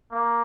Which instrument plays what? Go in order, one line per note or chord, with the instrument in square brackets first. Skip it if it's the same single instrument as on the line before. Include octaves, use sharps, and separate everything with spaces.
[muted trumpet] A#3